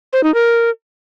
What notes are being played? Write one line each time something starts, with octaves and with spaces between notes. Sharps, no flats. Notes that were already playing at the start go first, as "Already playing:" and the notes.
C5
D#4
A#4